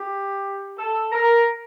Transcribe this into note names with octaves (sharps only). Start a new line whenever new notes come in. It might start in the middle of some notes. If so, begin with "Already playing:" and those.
Already playing: G4
A4
A#4